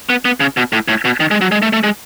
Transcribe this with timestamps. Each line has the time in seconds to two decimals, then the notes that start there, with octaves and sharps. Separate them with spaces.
0.10 B3
0.25 B3
0.40 C#3
0.57 B2
0.73 A2
0.88 A2
1.05 B2
1.20 D#3
1.31 G#3
1.41 F#3
1.52 G#3
1.62 A3
1.73 A3
1.84 G#3